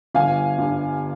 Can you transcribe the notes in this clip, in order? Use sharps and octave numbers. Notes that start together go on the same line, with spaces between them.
G1 F5 G#5
G2